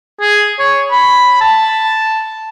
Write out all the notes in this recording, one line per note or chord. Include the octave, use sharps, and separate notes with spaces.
G#4
C#5
B5
A5